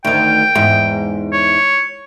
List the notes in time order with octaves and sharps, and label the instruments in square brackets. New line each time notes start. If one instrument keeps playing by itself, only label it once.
[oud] D2 D#3 [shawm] G5
[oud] E2 G#2
[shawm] C#5